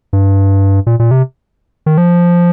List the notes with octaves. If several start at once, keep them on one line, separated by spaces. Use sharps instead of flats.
G2
A#2
A#2
C3
D#3
F3